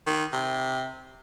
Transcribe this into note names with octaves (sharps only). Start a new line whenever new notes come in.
D#3
C3